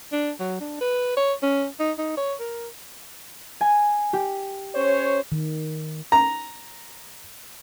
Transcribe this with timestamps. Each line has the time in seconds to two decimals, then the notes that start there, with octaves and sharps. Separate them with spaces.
0.12 D4
0.40 F#3
0.60 D4
0.81 B4
1.17 C#5
1.43 C#4
1.79 D#4
1.98 D#4
2.17 C#5
2.39 A#4
3.61 G#5
4.13 G4
4.75 C#4 C5 C#5
5.32 D#3
6.12 A#5